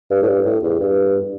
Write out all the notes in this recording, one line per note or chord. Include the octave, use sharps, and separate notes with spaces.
G2
A2
G2
A2
E2
G2